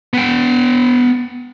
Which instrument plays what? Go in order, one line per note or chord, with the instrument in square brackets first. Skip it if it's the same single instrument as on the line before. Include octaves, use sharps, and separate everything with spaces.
[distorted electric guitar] B3 G5